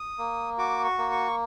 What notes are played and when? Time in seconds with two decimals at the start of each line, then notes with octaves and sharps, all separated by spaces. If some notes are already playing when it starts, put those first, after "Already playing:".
Already playing: D#6
0.18 A#3
0.58 F#4 D6
0.84 C#6
0.98 A#3
1.12 C#6